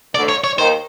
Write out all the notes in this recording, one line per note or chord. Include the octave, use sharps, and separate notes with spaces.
D2 D3 D5
C#5
C#5
D#2 D#3 C5